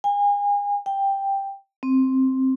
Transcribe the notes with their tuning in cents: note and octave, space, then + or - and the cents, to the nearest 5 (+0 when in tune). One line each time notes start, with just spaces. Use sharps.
G#5 -35
G5 +5
C4 +5